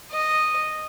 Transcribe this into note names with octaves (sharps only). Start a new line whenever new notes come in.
D#5